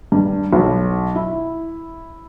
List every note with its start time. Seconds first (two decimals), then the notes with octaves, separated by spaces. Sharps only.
0.12 G2
0.53 B1
1.15 E4